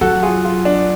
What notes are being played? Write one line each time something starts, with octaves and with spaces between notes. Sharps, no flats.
F#3 F#4 A4
F4 G#4
F4
D4